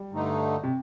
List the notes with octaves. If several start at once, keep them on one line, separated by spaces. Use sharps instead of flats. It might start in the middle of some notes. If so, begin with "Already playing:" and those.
Already playing: G3
G2 D3 A3 D#4
C3